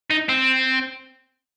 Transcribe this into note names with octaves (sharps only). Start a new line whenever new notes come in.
D#4
C4